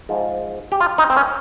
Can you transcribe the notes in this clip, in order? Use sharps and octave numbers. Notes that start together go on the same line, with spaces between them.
G#2 F3
G4
F4
D#4
C4
C#4